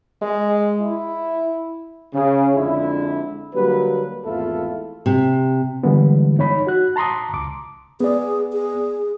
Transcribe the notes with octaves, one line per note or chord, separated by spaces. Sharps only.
G#3
E4
C#3
F2 D3 G#3 D4 E4
D3 F#3 G3 A#3 B4
G#1 E2 A3 E4 F4 A4
C3
D3 E3 G3 G#3 B3 D4
D#4 C#5 B5
F#4 F#6
A5 A#5 C6 D6 D#6
C#2 D6
B3 G#4 D5
G#4